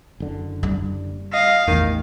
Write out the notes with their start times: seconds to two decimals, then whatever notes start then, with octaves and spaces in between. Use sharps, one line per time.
0.20 F#1 D3
0.63 G3
1.34 D#5 F5
1.68 A1 E2 D#3